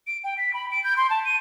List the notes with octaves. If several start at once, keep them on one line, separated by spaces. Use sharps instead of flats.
D7
G5
B6
B5
D7
G6
C6
A5
D#7